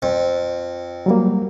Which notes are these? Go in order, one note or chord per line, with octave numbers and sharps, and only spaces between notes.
F2
F#3 G3 A#3